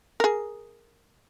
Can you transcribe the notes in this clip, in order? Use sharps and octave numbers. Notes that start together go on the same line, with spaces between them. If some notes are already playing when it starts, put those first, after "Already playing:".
G#4 A#4